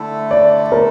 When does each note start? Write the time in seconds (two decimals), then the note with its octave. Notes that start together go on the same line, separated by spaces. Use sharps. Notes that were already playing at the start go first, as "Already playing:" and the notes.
Already playing: D3 A3 E4 A4
0.31 D5
0.72 A#4